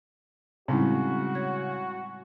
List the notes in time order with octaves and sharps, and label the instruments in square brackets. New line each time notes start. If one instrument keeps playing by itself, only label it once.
[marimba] A2 G3 G#3 [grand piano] C#3 [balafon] C4 D#4 E4 [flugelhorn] F#4
[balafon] C#5 [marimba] G#6